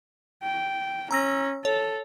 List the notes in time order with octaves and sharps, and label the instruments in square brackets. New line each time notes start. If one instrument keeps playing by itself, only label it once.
[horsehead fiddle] G5
[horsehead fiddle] C#4 [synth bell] A#5 E6 A#6
[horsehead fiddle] A4 [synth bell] C#5